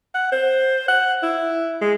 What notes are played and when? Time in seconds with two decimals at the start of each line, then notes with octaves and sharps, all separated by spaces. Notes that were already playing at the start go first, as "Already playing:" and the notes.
0.15 F#5
0.32 C5
0.88 F#5
1.23 E4
1.81 G#3